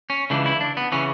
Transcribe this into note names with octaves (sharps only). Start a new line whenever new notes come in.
C#4
C#2 C#3 E3 D4
E4
D4
B3
C#3 E3 C#4